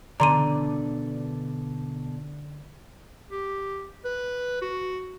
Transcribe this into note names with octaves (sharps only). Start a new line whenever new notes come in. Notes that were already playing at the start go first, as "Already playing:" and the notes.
B2 D3 A4 D5 A#5 C6 D#7
G4
B4
F#4